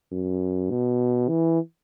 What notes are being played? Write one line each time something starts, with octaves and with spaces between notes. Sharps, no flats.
F#2
B2
E3